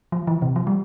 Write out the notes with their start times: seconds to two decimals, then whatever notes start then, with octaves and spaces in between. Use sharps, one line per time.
0.12 F3
0.27 E3
0.42 C3
0.56 F3
0.67 G3